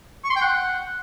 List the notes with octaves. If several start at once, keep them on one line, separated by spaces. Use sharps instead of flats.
C#6
C6
G5
F#5